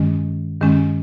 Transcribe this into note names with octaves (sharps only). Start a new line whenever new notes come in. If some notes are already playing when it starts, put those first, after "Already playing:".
Already playing: G2 D#3 G#3 C#4
G2 D#3 G#3 C#4